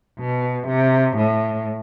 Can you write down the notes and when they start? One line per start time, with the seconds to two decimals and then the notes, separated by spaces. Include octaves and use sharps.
0.20 B2
0.68 C3
1.17 A2